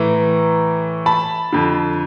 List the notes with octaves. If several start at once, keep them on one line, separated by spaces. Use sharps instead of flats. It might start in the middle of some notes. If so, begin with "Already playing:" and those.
Already playing: A2 E3 A#5
A5 B5
F2 D3